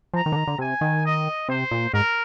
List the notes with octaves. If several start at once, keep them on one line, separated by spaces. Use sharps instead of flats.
F3 A#5
D#3
D3
D#3
D3
C3 G#5
D#3
D#5
C3 C5
A#2
G#2 A#4